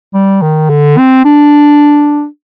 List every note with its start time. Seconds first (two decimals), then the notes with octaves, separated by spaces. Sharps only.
0.14 G3
0.42 D#3
0.70 D3
0.98 C4
1.25 D4